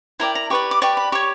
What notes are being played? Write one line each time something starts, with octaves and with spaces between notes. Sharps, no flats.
E4 A#4 D5 G5
A#5
G4 B4 D5 C#6
D6
G4 B4 D5 C#6
B5
G4 C#5 C#6